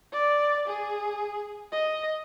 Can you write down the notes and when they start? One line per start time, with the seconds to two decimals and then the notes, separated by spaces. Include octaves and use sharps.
0.12 D5
0.67 G#4
1.72 D#5